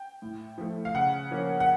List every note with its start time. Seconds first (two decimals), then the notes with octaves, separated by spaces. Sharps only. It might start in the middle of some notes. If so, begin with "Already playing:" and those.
Already playing: G5
0.22 A2
0.58 F3 A3
0.85 F5
0.94 C#3 F#5
1.31 F3 A#3 C#4
1.60 F#5